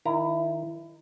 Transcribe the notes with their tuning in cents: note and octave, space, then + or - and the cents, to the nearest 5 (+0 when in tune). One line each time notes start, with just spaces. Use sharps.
D#3 +0 E4 +25 A#5 +0